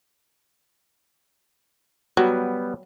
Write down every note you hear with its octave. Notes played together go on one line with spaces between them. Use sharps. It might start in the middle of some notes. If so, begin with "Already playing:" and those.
F#3 G3 B3 G5